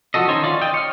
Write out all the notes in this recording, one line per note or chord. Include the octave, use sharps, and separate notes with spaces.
F3 F#4 A4 D#5
D#3 C#4 D#4 C5 C#5
F4 D5
D#5 G5
C#5 F6